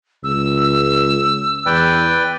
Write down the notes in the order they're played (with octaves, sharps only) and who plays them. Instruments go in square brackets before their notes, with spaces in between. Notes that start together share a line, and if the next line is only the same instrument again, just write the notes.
[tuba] C#2 [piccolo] E6
[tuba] E2 [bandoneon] B4 D5 G5